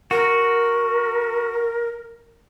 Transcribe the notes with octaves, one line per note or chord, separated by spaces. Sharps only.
F#4 A#4